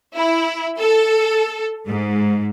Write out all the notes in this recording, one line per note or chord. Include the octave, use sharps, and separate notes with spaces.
E4
A4
G#2